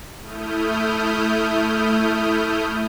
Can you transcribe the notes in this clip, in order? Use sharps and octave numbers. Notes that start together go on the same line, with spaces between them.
A3 E4 D#6 F6 G6